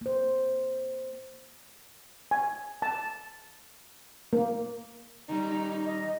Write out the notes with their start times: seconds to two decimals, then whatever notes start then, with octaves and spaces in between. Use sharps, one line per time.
0.01 A#3 C5
2.31 G#5
2.82 A5
4.33 A#3
5.29 D#3 G3 D#4
5.85 D#5